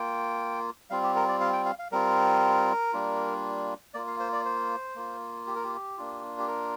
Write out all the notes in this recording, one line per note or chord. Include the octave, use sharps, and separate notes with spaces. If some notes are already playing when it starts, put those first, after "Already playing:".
Already playing: A#3 F4 G5
G3 C4 F4 F5
G4
A#4
D5
F5
G5
F5
F5
G3 C4 F4 A#4
G3 A#3 D4 F4
A#3 F4 D5
F5
C5
D5
C5
A#3 F4
G4
A#4
G4
A#3 D4 F4
G4
A#4